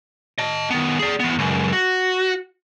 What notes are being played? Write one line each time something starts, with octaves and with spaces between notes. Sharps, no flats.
D#5 A5
D#3 B3
G#4 D5
E2 B3
C#2 F#2
F#4